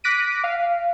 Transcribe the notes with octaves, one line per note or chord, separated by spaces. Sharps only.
D6 F#6 A#6 B6 D7 D#7
F5